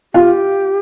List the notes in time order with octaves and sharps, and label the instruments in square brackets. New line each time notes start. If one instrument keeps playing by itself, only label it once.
[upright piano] F4 [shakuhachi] G4